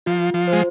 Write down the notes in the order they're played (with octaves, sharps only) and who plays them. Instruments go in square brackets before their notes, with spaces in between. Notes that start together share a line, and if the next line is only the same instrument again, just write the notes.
[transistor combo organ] F3 [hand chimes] F4
[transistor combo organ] F3
[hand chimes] C5
[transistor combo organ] G#3